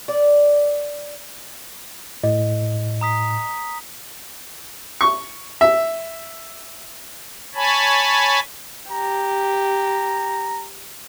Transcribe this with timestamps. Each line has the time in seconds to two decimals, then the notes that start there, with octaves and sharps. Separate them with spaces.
0.08 D5
2.24 A2 D#5
3.01 A#5 D#6 B6
5.01 C#6
5.61 E5
7.55 C#5 G#5 A5 B5
8.91 G4 A#5